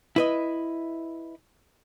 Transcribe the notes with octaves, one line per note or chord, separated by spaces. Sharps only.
E4 B4 D#5